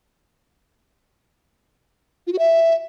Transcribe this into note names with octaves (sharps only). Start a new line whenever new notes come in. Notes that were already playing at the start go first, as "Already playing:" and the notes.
F4
F#4
E5